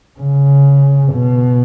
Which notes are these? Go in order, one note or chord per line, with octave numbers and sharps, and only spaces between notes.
C#3
B2